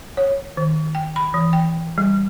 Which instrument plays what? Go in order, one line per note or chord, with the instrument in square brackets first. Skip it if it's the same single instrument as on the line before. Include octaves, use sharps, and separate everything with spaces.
[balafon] C#5
D#3
G5
B5
E3
G5
G3